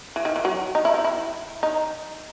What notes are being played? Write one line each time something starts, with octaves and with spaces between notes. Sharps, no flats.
E3
D#3
E3
F#3
D#4
E4
D#4
E4
D#4